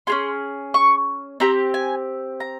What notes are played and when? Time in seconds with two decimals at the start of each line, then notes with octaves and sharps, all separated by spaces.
0.07 C#4 F4 G#4 C6
0.74 C#6
1.40 C4 G4 A#5
1.74 G#5
2.40 A#5